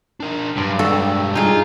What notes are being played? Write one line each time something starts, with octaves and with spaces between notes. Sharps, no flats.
D4 A#4
G2 F#3 C6
G#3 D4 F#4 A4
D#4 F4 G#4